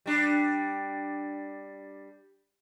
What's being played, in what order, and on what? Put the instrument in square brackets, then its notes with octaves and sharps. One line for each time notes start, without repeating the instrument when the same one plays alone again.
[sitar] G3 D4